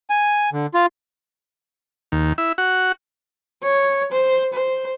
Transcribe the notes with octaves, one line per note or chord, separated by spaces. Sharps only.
G#5
D3
F4
D#2
E4
F#4
C#5
C5
C5